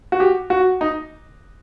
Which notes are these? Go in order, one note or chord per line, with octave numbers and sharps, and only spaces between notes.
F#4
G4
F#4
D#4